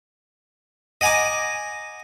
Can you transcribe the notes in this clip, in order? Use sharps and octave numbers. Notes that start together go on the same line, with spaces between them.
D#5 F#5 G#5 A#5 D6